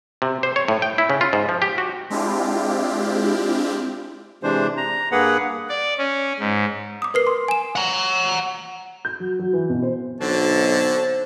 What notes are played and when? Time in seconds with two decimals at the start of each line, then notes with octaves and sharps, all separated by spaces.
0.22 C3
0.43 C5
0.56 C#5
0.68 A2
0.82 G5
0.98 E4
1.10 C#3
1.21 F4
1.33 G#2
1.49 F3
1.62 G4
1.78 F#4
2.10 G#3 C4 D4 E4 F4 G4
4.43 C3 E3 G#3 D4 C5
4.77 A#5
5.12 G2 A#3 G#4 B4 F#5
5.69 D5
5.98 C#4
6.39 G#2
7.02 D6 D#6
7.14 A#4 B4 C7
7.27 C6
7.48 G#5 E7
7.76 F#5 A#5
9.05 G6
9.20 F#3
9.39 F#3
9.53 E3
9.70 B2
9.82 C5
10.21 B1 D3 C4 C#5 A5